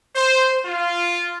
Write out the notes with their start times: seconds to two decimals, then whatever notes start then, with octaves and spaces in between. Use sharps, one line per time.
0.15 C5
0.66 F4